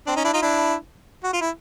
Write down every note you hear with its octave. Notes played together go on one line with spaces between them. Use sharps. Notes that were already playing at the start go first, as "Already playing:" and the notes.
C4 D4
C#4 D#4
D4 E4
D#4 F4
D4 E4
F#4
F4
E4